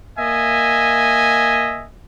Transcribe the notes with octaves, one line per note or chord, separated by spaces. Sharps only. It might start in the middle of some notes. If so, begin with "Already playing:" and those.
A#3 D#5 E5 G#5